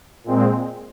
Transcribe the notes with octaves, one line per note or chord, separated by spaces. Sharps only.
A#2 G#3 C4